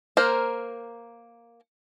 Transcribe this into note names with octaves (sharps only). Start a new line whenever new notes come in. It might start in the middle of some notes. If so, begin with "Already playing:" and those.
A#3 A#4 C5